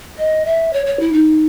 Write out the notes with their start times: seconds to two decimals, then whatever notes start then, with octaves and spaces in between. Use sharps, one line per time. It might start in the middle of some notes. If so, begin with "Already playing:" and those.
0.18 D#5
0.46 E5
0.73 C#5
0.86 C#5
1.00 E4
1.13 D#4